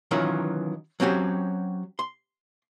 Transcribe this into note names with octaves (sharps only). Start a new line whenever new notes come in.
D#3 E3 F#3 C#4 F4 A#4
F#3 C4 C#4 F#4 G4
C6